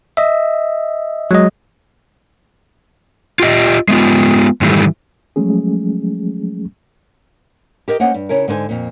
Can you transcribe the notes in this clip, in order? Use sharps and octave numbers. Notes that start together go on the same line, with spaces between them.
D#5 E5
F#3 G#3 D#5
F4 G4 D#5
G#3 B3 F4
G#2 D#3 E3 G3 A3
F3 F#3 G#3 A3 C#4 G#4
G4 A#4 C#5 D#5
A#3 C#4 C5 D#5 F#5
G2
C#3 C#4 E4 A#4
G#2 D3 B4 C5 G#5
F2 A#2